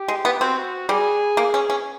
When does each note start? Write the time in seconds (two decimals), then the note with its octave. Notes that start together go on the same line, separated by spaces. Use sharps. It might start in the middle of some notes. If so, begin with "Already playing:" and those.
Already playing: G4
0.08 G#3
0.25 B3
0.40 C4 F#4
0.89 G3 G#4
1.37 A#3
1.54 C#4
1.70 C#4